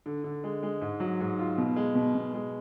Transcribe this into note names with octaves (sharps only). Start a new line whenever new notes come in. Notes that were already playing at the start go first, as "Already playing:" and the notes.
D3
D3
G#3
G#3
G#2
F#3
G#2
F4
B2
G#3
B2
B2
G#3